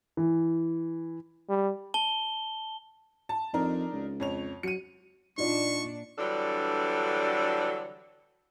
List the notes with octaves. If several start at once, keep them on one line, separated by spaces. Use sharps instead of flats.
E3
G3
A5 G7
A5
F2 D4 D#4 A#4
C#2
F2 C#5 F7
F#3 C#7 D#7
A#2 D4 D#4 F4 D5 C#6
D3 E3 F#3 G3 D4 A4